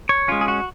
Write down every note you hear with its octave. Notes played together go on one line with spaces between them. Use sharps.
C#5
G#3 C#4 F4
G#4
F#4